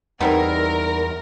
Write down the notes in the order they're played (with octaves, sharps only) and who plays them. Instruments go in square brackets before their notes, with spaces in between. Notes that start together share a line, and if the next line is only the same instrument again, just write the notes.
[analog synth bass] E2 [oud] G3 D#4 [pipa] B3 C4 E4 [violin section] A#4